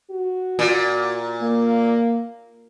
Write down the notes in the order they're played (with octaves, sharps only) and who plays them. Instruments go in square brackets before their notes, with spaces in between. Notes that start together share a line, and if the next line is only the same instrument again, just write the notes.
[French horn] F#4
[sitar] A#2
[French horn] A#3